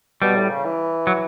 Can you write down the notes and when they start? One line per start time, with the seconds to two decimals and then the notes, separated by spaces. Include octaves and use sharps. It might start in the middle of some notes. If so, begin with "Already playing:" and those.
0.22 B2 G3
0.36 A2
0.50 C#3
0.65 E3
1.07 F#3